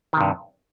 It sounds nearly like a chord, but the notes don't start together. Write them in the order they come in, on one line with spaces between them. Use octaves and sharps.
D#3 C3 G2